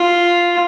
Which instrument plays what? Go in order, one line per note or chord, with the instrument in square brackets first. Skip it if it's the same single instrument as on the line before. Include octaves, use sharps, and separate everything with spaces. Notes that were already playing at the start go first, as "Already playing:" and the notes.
Already playing: [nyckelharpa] F4